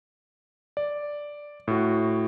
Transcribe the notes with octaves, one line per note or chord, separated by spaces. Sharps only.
D5
A2 F#4